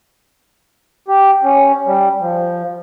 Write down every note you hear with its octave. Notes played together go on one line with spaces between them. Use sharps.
G4
C#4
G3
F3